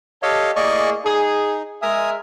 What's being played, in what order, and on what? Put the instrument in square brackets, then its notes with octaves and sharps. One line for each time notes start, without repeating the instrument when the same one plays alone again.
[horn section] G4 A4 [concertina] C#5 D#5 F5
[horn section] A2 A#3 G#4 [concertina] D5 D#5 C#6
[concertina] D#4 [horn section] G#4
[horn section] G#3 A#4 E5 [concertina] G#5 D#6